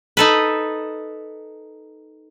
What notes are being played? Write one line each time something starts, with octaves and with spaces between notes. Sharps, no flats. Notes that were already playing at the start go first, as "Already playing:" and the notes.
D#4 A4 B4